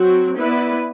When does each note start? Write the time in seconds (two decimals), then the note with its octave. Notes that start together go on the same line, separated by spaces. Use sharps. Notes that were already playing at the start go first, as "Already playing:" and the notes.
Already playing: F#3 C4 F#4
0.36 B3 E4 B4 D5